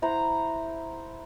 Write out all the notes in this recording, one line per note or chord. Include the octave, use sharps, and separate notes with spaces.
E4 C5 F#5 A#5